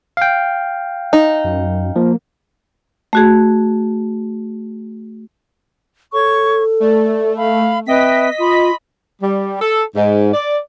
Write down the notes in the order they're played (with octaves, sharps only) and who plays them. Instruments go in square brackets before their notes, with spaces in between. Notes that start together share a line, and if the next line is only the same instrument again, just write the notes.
[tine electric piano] F5 G5
[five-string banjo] D#4
[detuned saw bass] F#2
[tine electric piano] F3 [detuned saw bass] A#3
[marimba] A3 F#4 G#4
[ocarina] A4 [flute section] C#5 C#6
[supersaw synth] A3 [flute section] D5
[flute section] F5 B5
[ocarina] C4 [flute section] B4 E5 G5 [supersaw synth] D#5 B6
[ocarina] F4 [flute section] B5 C6
[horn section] G3
A4
G#2
D5